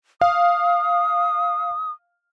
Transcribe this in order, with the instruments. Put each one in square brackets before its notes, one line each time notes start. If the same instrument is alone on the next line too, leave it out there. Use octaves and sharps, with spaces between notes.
[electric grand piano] F5 [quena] D#6